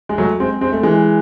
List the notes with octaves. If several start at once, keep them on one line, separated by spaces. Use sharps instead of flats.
G#3
F#3 A3
G#3 C4
G#3 C4
A3
E3 G#3